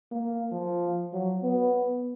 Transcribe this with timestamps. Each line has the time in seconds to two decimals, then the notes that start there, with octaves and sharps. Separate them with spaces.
0.12 A#3
0.52 F3
1.13 F#3
1.43 B3